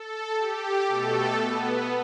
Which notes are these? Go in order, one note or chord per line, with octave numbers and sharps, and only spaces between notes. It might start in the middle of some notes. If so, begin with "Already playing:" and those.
Already playing: A4
G4
B2 A3 A4
B3